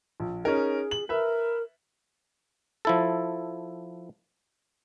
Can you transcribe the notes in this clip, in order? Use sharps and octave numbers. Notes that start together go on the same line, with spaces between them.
A#1
C#4 D#4 G#4 A#4
F#7
A#4 B4 E5
F3 E4 A4